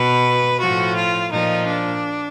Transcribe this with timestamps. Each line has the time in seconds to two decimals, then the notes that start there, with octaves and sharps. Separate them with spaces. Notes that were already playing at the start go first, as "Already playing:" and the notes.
Already playing: B2 B4
0.60 A2 F3 F#4
0.96 F4
1.31 A#2 F3 D#4
1.67 D4